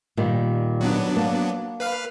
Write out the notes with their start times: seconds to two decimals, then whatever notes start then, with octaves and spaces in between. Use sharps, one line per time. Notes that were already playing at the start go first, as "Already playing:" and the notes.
0.17 A#2 D#3 G3
0.81 F#3 B3 D4
1.16 A#3 A5
1.80 B4 F5 F6